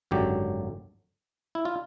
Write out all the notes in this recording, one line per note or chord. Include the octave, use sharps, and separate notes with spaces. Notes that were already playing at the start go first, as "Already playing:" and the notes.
G#1 F#2 D3 F#3 G4
E4
F4